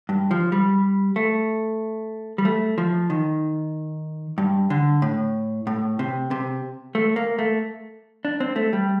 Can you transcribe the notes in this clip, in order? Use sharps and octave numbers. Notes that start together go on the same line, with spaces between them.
G2
F3
G3
A3
G3
A3
F3
D#3
G2
D3
A2
A2
C3
C3
A3
A#3
A3
D4
C4
A3
G3